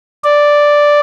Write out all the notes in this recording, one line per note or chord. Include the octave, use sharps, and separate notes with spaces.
D5